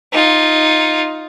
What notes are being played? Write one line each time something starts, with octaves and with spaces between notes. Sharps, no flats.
D#4 F4